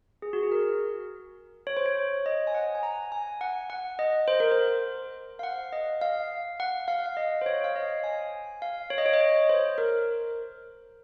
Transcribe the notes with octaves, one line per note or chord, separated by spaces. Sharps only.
G#4
F#4
G#4
A#4
C#5
C5
C#5
D#5
G#5
F#5
G#5
A#5
G#5
F#5
F#5
D#5
C5
A#4
C5
F5
F#5
D#5
F5
F#5
F5
F5
D#5
C5
C#5
F5
D#5
G#5
F5
C#5
D#5
C#5
D#5
C#5
C5
A#4